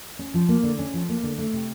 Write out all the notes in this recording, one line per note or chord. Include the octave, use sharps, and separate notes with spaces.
C#4
F3
A#3
D3
C#4
F3
A#3
D3
A3
C3